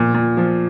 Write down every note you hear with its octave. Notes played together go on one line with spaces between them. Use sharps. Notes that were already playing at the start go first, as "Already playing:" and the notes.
Already playing: A#2 F3
A#2
F3